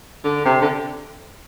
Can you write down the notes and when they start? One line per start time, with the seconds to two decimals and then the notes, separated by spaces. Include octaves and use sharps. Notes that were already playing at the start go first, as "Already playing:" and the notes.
0.24 D3
0.45 C3
0.62 D3